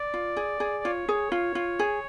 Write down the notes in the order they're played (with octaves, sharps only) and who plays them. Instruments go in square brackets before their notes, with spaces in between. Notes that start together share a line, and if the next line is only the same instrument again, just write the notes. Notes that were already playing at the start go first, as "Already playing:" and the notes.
Already playing: [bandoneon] D5
[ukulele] F4
G#4
G#4
[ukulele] F4 [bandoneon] C#5
[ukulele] G#4
F4
F4
G#4